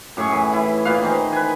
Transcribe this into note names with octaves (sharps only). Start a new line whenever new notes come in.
F#2 A2 G#4 C#6
E3
E4
A#2 B4 F5
D#3 E3 C5 D#5
B4 G#5